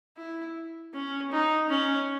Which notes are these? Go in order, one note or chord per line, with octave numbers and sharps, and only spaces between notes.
E4
C#4
D#4
C#4